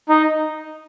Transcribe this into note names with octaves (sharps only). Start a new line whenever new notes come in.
D#4